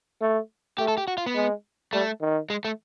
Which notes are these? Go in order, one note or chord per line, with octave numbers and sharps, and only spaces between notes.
A3
A3 G4
A4
G4
F#4
F4
B3
G#3
G3 A3
D#3
G#3
A3